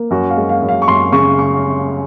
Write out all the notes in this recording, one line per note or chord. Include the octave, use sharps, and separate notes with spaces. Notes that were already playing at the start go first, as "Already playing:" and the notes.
Already playing: A#3
F#2 F#4
F5
G#3
F5
F#2
F5
C#6
F#2 C6
C#3 C#6
C#6